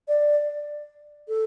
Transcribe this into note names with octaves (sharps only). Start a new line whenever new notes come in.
D5
A4